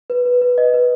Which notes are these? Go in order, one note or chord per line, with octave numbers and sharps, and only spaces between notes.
B4
B4
B4
D#5
B4